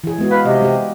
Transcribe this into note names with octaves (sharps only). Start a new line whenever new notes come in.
E3 G#4
G#3 B3 F#4
B4 F5
C3 D#5
G3 G4